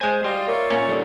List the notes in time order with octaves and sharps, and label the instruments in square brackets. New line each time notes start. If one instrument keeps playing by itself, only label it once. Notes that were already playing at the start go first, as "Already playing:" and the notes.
[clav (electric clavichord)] G#3 G#5 [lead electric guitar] C5
[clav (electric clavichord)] G3 [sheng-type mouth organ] D#5 [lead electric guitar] F5 C6
[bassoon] A#3 [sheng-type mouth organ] C#5 D5 E5
[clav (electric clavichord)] A#2 C#4
[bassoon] D3 [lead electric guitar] G3 D#4